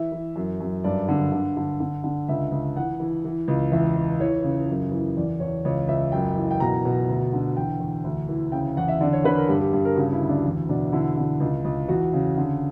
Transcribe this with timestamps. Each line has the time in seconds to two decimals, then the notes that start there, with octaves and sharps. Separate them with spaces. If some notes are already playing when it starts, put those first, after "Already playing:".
Already playing: E3 E5
0.12 E3
0.36 F#2
0.60 F#2
0.84 G2 D5
1.08 D3
1.32 D3
1.57 D3
1.80 D3
2.04 D3
2.28 C#2 E5
2.52 C#2
2.76 E3 F#5
3.00 E3
3.25 E3
3.48 C#2
3.72 E2 E5
3.96 E2
4.20 E3 C#5
4.44 C#3
4.69 F#2
4.92 E3
5.16 E2 D5
5.40 E2 C#5
5.65 C#2 C#5
5.88 C#2 E5
6.12 F#2 G5
6.36 E3
6.51 G5
6.60 B2 A#5
6.85 B2
7.08 D2
7.33 D3
7.57 E2 G5
7.80 E2
8.04 D2
8.29 E3
8.52 C#3 G5
8.77 E2 F#5
8.88 E5
9.01 D3 D5
9.13 C#5
9.24 D3 B4
9.37 A#4
9.48 G2 G4
9.60 G4
9.73 G2 G4
9.85 A#4
9.96 C#3 F#4
10.12 E4
10.21 D2
10.29 D4
10.40 F#4
10.45 E2 E4
10.69 B2 D4
10.92 D3 E4
11.17 D3
11.40 C#2
11.65 C#2
11.88 E2 F#4
12.13 C#3
12.37 D3